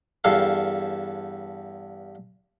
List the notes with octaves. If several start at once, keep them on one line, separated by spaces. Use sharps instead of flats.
E2 G2 A4 F5